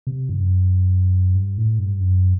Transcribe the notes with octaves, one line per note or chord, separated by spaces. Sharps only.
C3
G2
F#2
G2
A2
G2
F#2